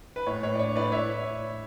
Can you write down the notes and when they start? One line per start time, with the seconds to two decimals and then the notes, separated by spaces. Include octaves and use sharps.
0.16 B4
0.27 A2 C#5
0.43 A2 C#5
0.55 D5
0.59 D4 C#5
0.75 A2 B4 D5
0.92 E4 C#5 E5
1.09 E4